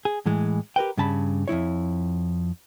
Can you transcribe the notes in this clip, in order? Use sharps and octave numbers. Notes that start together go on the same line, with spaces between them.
G#4
A2 E3 G#3
G4 A#4 B4 G5
G2 C#3 A5 B5
F2 G#3 E4 C#5